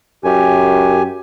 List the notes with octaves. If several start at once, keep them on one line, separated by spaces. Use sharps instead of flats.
F#2 G4 G#5